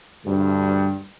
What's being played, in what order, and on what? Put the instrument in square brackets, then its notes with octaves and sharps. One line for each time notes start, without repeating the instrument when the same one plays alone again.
[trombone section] D2 G2